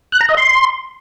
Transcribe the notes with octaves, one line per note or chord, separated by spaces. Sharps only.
F#6
A#5
D#5
C6